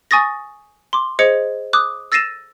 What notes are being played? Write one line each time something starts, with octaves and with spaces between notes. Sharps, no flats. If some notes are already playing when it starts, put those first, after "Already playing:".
G#5 C#6 D#6 A6 A#6
C6 D6
G#4 C5 D#5 G#6 C#7
D6 D#6 F#6
E6 A6 A#6 C7 D#7 E7